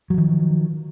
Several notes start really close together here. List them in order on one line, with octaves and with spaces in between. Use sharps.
F#3 F3 D#3